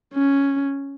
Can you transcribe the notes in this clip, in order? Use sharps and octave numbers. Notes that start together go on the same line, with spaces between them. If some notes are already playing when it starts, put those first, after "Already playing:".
C#4